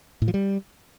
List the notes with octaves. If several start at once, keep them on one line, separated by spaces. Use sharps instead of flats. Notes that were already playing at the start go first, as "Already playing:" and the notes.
A2
F3
G3